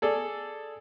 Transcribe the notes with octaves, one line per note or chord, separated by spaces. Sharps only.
G#4 A4 D5